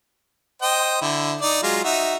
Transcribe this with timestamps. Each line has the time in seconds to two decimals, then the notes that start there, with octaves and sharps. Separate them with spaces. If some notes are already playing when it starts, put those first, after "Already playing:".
0.62 C5 D#5 G5
1.01 D3 E4
1.41 D#4 D5
1.63 F#3 G#3 F4
1.84 D#4 F#4 E5